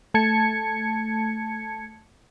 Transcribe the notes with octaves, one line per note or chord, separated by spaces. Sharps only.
A3 A5 G#6 C#7